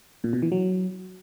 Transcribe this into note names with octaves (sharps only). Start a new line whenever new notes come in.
A#2
B2
E3
F#3